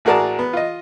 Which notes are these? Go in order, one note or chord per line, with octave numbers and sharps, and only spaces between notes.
A1 F#4 G#4 A#4 D5 A5
B3
F4 D#5